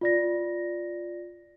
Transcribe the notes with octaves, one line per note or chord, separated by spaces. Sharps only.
F4 D5 A#6